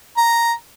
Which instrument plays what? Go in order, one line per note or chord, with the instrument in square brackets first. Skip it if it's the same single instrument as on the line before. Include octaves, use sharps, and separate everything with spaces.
[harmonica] A#5